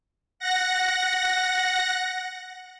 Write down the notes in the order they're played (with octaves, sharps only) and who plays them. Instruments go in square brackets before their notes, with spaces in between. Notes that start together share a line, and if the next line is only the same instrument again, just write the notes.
[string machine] F#5 A#6